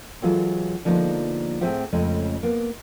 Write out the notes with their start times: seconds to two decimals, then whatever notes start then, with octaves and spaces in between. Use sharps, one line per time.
0.22 E3 F#3 G#3 F4 G#4 A4
0.85 D3 F3 G#3 A#3 B3 D#4
1.61 A2 C4 G#4 C5 E5 F#5
1.93 F2 C#3 G#3 A3 C#4
2.43 A#3 B3